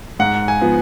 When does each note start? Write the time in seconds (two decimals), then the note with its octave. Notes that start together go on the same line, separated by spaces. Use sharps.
0.19 G#2 F#5
0.48 G#5
0.62 F3 B3